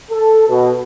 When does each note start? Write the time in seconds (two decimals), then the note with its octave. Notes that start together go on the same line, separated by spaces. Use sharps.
0.11 A4
0.48 B2